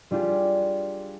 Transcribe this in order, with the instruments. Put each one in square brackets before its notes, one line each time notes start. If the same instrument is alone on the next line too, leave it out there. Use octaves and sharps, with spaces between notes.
[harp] G3 D4 F4 G4 G#4